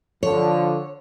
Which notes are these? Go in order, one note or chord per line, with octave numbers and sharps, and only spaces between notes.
D3 F3 C#5